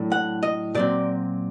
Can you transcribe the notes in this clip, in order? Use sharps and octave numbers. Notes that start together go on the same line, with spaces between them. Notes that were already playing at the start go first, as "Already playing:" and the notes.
Already playing: A2 F#3 A3 D4
F#5
D#5
A#2 F#3 C4 D5